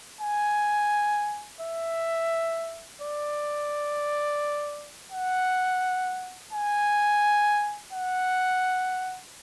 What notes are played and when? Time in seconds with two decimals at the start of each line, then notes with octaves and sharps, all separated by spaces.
0.21 G#5
1.61 E5
3.02 D5
5.12 F#5
6.53 G#5
7.93 F#5